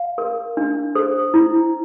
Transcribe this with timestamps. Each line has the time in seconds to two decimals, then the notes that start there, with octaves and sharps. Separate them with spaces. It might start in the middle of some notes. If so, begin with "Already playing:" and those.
Already playing: F5
0.18 A#4
0.57 D4
0.95 A4 C5
1.34 E4